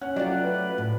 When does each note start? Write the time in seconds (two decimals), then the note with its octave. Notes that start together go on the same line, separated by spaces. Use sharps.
0.02 C#4 F#5
0.16 F#3 A3 F4 D5 G5
0.41 B4
0.78 A2